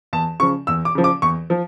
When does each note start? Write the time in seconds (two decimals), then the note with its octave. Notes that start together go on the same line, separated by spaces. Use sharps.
0.13 E2 A5
0.40 C#3 F3 C#6
0.67 E2 E6
0.85 D6
0.95 C#3 F3
1.04 D6
1.22 E2 C#6
1.50 F3